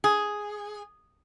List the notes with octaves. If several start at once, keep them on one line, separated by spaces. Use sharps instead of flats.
G#4